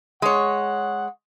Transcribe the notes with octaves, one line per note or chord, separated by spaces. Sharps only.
G#3 C#5 F#5